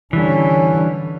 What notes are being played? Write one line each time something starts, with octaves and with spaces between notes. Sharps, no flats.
D3 E3 G3 C#4